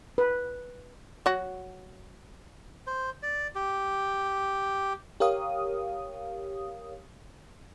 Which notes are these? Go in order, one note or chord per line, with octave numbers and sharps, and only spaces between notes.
B4
F#3 F#4
C5
D5
G4
G4 A#4 C#5 F5 D#6